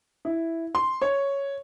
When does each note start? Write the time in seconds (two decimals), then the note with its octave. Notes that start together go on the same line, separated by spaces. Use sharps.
0.25 E4
0.75 C6
1.02 C#5